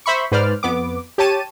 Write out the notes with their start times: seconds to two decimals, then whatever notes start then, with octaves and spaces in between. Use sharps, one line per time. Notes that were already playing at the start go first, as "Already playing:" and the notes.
0.06 C5 E5 B5 C#6
0.32 G#2 B4 C5 D5 F6
0.63 F2 B3 D6
1.18 G4 C#5 A5 D#7